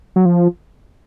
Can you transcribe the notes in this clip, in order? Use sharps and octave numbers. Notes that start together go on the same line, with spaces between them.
F#3
F3